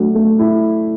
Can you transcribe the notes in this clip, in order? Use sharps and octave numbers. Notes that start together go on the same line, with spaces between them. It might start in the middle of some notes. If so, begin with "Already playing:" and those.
Already playing: F#3 A3 D4
A3
E4